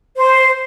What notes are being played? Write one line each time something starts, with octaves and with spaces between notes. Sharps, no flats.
C5